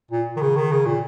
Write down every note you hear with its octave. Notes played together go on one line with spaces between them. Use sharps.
A#2
D#3
C#3
D#3
C#3
A#2